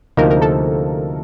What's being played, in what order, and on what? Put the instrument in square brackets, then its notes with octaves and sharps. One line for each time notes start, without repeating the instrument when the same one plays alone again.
[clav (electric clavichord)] D2 C3 F3 A#3 D#4 [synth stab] A#4
[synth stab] A#4
A4